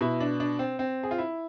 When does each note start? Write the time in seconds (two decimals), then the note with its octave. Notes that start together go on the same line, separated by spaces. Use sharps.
0.01 B2 E4
0.20 D4
0.40 D4
0.59 C4
0.79 C4
1.03 G#4
1.11 F4
1.18 E4